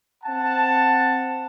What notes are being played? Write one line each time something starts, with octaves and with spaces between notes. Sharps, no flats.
C4 F#5 A5